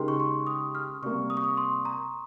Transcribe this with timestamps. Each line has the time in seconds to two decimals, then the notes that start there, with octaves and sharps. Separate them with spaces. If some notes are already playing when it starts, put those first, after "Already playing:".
Already playing: C#3 G#3 D#4 G4 A#4 C6
0.08 C#6
0.20 C6
0.47 D#6
0.75 F6
1.02 C3 G3 A#3 C#6
1.30 D#6
1.37 C#6
1.44 D#6
1.57 C6
1.85 A#5